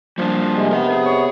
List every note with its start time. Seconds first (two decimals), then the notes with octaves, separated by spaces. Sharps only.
0.18 F3 G3 A#3 D4
0.55 C3 G#3
0.71 C3 B3 A#4 D#5
0.92 G#4
1.06 C#5